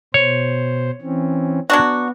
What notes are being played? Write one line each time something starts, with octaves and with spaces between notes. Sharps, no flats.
B2 C5 C#5
E3 C4 C#4
F#3 B3 D4 F#4